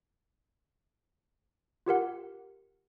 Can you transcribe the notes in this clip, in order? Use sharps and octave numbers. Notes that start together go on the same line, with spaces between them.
F4 G4 A#4 F#5